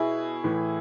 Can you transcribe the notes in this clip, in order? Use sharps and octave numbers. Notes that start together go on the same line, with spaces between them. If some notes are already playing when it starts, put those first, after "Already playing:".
Already playing: B2 E4 G#4
A2 E3